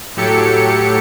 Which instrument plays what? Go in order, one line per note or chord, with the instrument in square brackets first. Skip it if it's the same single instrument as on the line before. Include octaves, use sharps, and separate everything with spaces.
[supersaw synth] A2 F#3 G4 A4 C#7